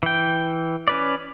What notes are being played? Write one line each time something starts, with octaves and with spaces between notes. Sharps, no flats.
E3 G5
C#4 B4 D5